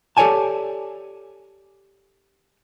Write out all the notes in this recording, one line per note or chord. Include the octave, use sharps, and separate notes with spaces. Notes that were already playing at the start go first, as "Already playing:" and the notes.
G4 A4 C#5 D5 G#5 A5